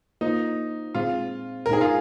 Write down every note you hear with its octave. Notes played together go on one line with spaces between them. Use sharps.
A#3 D#4 F4 C5
A#2 G#3 C4 F4 G#4 C5
A#4
A#2 G#3 D#4 G#4 C5
F4